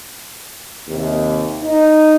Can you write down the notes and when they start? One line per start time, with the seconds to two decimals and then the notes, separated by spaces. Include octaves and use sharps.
0.87 D#2 C3
1.63 D#4